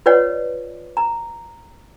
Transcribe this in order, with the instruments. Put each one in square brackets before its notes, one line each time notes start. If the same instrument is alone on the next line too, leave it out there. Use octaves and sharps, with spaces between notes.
[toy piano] F4 B4 C#5 D5 F#5
A#5